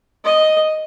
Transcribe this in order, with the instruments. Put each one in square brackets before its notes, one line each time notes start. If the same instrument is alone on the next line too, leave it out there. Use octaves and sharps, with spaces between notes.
[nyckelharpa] D#5